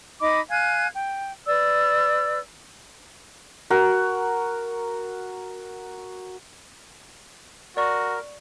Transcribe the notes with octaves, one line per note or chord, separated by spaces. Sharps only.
D#4 D#5 B5 D6
F5 G#5 F#6 G#6
G5
B4 D5 E6
F#4 A#4
F#4 A#4 D5 C#6